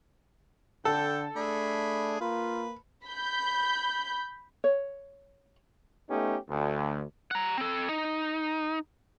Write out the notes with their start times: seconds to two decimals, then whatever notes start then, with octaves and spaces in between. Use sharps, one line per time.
0.85 D3 A4 G5
1.36 A3 D4 G#4 B5
2.21 A#3 F4 B4
3.06 B5 G6
4.64 C#5
6.08 A3 B3 C#4 D#4 G4
6.49 D2
7.31 F#5 A#5
7.58 C4 A4
7.89 D#4